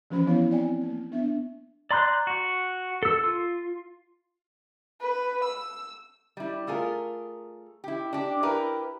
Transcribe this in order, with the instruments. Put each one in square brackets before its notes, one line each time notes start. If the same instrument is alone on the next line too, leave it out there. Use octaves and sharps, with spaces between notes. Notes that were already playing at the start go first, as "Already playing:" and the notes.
[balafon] E3 F3 C#4 C5 B5
B3 E4 C#5 F5
C4 D5 G5 G#5
A#3
B3 D4 E5
[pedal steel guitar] D5 A#5 C6 F#6 G6
F#4
A4 E6
F4
[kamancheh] B4
E6
[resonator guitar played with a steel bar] G3 E4
A3 F4 G#4 A#4
E4 G4
D4 G4
E4 G4 A#4 B4